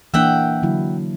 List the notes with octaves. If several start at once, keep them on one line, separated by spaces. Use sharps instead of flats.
E3 A#3 D4 E5 F#5 G5
D3 F#3 E4